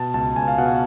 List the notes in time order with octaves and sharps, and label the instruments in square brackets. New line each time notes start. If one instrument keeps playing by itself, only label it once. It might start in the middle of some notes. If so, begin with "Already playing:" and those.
Already playing: [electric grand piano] B2 A5
C#2 A5
C#2 G#5
F5
B2 F#5